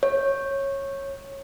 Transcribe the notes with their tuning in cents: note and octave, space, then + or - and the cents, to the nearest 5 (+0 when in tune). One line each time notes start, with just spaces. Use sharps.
C#5 -15